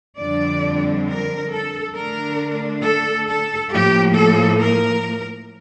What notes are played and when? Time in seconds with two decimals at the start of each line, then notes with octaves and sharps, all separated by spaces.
0.19 F2 D3 G3 D4 D5
1.07 A#4
1.52 A4
1.95 D3 A3 D4 A#4
2.83 A4
3.27 A4
3.72 A2 F3 A#3 G4
4.16 A4
4.60 A#4